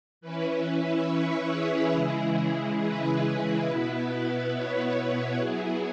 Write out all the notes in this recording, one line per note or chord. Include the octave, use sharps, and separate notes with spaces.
E3 C#4 E4 B4
B4
E5
C#5
G#4
C#3 E3 G#3 E4 G#4
B4
B2 B3 E4
C#5
F#3 B3 E4 G#4